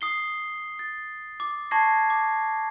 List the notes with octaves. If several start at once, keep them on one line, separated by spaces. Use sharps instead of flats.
D#6 C7 G7
A6
D6
A5 C#6 G#6 A#6 C7
D6